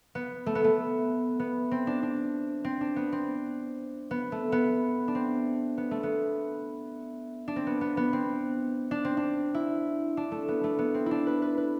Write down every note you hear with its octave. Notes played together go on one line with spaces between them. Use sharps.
B3
A3
B3
A3
B3
C4
D4
D4
C4
D4
B3
C4
B3
A3
B3
D4
C4
B3
A3
B3
D4
C4
B3
B3
B3
C4
D4
C4
D4
E4
D4
A3
B3
A3
B3
C4
D4 E4
B4
B4
B4